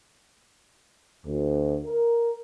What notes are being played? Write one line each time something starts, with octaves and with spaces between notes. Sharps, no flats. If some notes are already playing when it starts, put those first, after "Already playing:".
D2
A#4